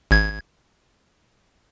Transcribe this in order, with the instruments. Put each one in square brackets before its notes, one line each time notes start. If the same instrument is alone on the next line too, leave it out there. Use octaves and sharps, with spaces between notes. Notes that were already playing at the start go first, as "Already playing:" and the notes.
[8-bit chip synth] G#1 G#6